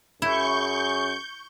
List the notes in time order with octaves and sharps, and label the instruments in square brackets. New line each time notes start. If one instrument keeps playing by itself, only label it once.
[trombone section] F#2 G#4 [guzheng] E4 [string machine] C#6 G6